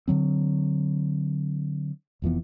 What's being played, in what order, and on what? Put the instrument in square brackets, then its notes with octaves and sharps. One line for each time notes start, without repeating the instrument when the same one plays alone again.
[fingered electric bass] D3 D#3 F#3 C4
F1 F2 E3 B3